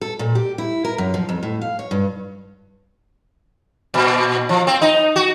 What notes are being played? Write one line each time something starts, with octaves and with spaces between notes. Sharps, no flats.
A4
A#2
G4
E4
A#4
F#2
F3
F2
A2
F5
C#5
G2
A#2
F3
C4
D#4
F#4